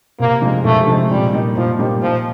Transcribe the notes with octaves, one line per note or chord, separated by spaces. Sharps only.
C3 A#3
F3 G#3 C4 D#4
C3 A3
F3 G#3 C4 D#4
A#2 G3
G3 A#3 D#4 G4
A#2 F3
G3 A#3 D#4 G4
A#2 F3